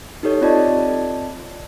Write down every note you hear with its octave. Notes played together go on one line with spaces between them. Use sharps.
D#4 G4 A4 C#5
C4 F4 D5 D#5 A5